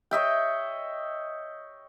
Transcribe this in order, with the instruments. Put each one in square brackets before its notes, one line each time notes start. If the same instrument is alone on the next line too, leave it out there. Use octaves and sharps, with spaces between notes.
[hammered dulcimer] C#5 D#5 E5 G5